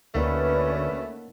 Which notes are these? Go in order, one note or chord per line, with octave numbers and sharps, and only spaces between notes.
D2 A3 A#3 C#4 D#4 B4 D5 F#5